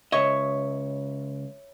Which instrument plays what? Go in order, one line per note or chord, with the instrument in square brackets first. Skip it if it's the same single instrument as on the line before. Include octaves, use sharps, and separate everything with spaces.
[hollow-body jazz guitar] C#2 D#5 [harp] C#5 E5 C#6